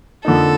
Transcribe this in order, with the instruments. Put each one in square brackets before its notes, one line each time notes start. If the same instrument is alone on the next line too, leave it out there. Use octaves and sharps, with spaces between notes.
[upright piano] F2 D3 F3 A#3 D#4 [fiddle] A4